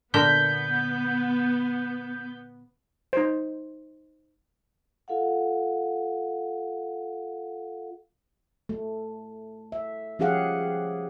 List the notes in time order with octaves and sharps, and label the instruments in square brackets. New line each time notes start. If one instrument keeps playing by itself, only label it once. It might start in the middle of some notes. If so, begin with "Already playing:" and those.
[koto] A#2 D3 A#4 [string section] B3 [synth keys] G6 B6
[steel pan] D#4 C5
[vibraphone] F4 A4 F5 F#5
[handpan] A3
E5
F3 C#4 G4 G#4 F5 F#5